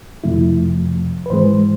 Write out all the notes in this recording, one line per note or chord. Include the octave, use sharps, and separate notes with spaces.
F2 C3 F3 A3 E4
B4
G#2 E3 G#3 C5